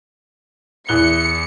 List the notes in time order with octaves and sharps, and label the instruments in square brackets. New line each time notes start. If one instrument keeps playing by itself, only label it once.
[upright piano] E2 F#6 G7 [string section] C#7